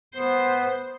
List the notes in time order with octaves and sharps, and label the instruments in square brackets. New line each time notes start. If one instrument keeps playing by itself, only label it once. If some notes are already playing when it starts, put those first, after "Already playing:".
[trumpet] B3 [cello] C5